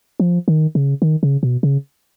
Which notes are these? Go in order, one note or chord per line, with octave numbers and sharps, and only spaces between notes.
F3
D#3
C#3
D#3
C#3
B2
C#3